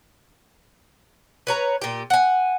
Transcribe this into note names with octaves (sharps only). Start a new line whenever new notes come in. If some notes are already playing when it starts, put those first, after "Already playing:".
B4 C#5 A#5
A#2 G4
F#5 G#5